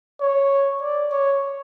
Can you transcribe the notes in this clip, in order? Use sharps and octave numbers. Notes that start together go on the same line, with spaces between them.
C#5
D5
C#5